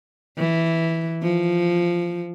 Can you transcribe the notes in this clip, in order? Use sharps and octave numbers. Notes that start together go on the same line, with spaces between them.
E3
F3